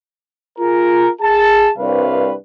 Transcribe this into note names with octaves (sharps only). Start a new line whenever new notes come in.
F4 G#4 A#4
G#4 A5
C2 G2 C3 B4 C#5 F5